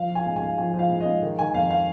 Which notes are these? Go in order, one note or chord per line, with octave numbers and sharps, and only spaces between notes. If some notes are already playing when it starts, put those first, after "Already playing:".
Already playing: F3 F5
F3
G#5
G#2
G#5
G#2
F3 G#5
F3
F5
G#2
D#5
G#2
D#3
D#3 G#5
F2 F5
F5